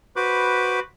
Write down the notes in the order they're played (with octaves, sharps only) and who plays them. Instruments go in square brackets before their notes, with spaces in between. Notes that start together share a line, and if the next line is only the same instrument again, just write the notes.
[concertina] F#4 B4 C5 B5 D6